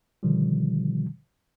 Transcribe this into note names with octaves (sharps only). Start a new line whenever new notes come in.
B2 D3 D#3 F3 G3